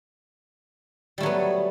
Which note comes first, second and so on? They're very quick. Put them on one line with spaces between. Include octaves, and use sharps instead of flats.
G3 A3 F#3 B3